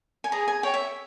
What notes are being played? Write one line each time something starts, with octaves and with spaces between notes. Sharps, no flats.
G#5
G#4 A#5
G#5
C#5 G5
E5